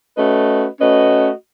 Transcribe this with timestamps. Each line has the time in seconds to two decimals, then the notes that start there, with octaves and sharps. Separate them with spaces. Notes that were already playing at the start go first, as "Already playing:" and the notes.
0.15 A3 C#4 F#4 B4 D#5
0.79 A3 C#4 F#4 B4 D#5